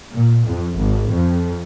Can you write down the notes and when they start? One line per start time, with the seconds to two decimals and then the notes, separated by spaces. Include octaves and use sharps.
0.13 A#2
0.44 F2
0.77 G#1
1.11 F2